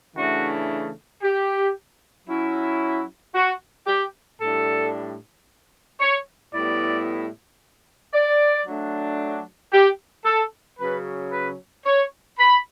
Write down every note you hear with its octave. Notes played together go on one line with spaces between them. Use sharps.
C#3 E3 A3 D4 F#4
G4
F#3 C#4 E4
F#4
G4
A2 G3 D4 A4
C#5
A2 G3 B3 E4 D5
D5
F#3 A3 D4
G4
A4
C#3 F#3 C#4 B4
B4
C#5
B5